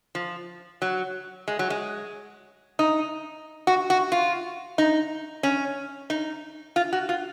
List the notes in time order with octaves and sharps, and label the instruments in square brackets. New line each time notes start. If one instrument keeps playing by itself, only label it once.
[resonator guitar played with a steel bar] F3
F#3
G#3
F#3
G#3
D#4
F#4
F#4
F4
D#4
C#4
D#4
F4
F#4
F4